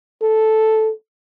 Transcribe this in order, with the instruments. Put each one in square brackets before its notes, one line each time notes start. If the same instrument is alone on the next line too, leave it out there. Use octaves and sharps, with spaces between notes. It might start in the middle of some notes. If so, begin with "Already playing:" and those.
[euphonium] A4